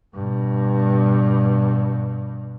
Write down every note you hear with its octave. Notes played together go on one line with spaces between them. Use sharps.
G2 B2